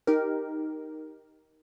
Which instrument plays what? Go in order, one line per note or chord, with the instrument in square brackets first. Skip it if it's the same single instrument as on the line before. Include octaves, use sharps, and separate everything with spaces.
[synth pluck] D#4 G4 A#4